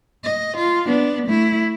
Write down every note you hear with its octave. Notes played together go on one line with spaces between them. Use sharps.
D#5
F4
B3 D4
A3 E4